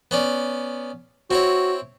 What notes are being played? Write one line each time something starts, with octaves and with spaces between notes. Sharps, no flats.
B3 C#4 D5
C4 E4 F#4 C#5